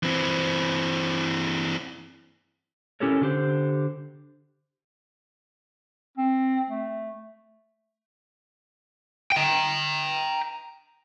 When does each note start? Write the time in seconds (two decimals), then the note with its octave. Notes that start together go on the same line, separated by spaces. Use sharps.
0.03 E3 C4
3.00 C#4 E4 G4 A4 A#4 C#5
3.22 D3 G4 C5
6.18 C4
6.70 A3
9.32 G5 A#5